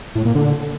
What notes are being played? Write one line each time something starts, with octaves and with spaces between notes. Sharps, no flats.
A2
A#2
D3